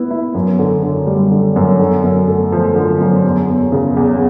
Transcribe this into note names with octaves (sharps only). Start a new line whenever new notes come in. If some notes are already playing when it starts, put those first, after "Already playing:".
Already playing: B3 E4
E4
F#2
D3
D3
G3
D3
F#2
D3
F#2
A3
F3
D3
F#2
E2
E2
C#3
E2